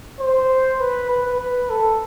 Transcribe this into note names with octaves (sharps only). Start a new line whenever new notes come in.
C5
B4
B4
B4
A4